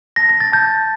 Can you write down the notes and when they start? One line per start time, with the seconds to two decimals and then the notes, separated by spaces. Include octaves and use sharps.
0.16 A5 A#6
0.29 A#6
0.40 A6
0.52 A5 G6